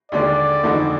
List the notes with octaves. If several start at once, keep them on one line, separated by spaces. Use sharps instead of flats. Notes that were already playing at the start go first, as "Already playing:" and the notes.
D#2 D3 G#3 D4 D5
F2 D3 G#3 D#4 F#4